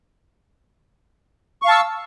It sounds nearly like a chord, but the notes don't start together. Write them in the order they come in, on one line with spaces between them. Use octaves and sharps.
C#6 F5 A5 E6